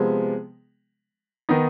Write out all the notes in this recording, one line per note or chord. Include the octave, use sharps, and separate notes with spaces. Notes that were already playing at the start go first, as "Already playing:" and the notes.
Already playing: C3 F3 G#3 B3
D#3 B3 D#4